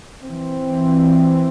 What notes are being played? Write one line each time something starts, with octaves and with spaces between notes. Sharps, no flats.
E3 C4